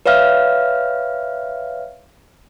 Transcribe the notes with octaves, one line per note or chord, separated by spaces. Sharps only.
B4 C#5 E5 F5 F6